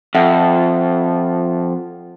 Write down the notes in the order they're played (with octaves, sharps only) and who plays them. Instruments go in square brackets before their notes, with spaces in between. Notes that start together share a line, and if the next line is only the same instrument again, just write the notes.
[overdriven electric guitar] F2 [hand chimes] E5 F#5